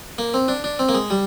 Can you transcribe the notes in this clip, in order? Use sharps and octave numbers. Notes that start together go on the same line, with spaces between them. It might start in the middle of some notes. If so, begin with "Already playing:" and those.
A#3
C4
D4
D4
C4
A#3
G#3
G3